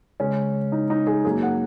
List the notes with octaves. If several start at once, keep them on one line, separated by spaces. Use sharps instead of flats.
C#3 G#3 C#4
D#4
D#4
G#4
F#2 F#3 A#3 G#4
F#5